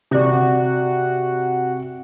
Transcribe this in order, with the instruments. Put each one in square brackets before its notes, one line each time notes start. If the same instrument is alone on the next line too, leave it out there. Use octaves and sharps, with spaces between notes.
[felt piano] C3 D5 [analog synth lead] F#4